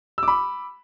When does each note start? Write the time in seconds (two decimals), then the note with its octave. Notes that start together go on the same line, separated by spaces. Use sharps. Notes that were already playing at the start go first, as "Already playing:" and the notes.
0.18 E6
0.23 D6
0.28 B5